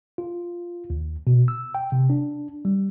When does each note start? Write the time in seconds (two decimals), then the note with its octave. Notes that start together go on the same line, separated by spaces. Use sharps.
0.18 F4
0.90 D#2
1.27 B2
1.48 E6
1.75 G5
1.92 C3
2.10 D4
2.65 G3